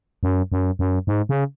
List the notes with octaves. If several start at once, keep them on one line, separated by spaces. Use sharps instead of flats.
F#2
F#2
F#2
G#2
C#3